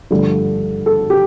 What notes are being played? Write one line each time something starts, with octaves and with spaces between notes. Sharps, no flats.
G2 D3 F3 A3 D4
A4
G4